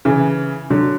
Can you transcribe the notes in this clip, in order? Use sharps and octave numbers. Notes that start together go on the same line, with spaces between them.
C#3 E3
D3 F#3